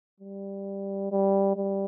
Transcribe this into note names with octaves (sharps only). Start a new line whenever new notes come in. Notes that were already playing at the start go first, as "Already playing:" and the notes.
G3
G3
G3